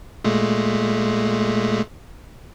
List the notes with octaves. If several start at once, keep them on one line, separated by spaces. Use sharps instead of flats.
A#2 G#3 A3